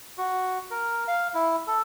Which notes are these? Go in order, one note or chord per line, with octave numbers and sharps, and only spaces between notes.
F#4
A#4
F5
E4
A4